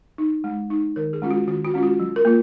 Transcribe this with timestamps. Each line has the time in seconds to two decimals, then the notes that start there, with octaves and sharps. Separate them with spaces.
0.18 D#4
0.44 G#3
0.70 D#4
0.96 D#3 A#4
1.13 G#4
1.22 G#3 C#4 F4
1.31 F#4
1.48 D#3 F#4
1.65 F#4
1.74 G#3 C#4 F4
1.83 F#4
2.00 F#3
2.16 A#4
2.25 A#3 F4